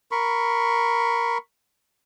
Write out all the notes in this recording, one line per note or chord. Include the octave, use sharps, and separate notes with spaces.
A#4 B5 C#6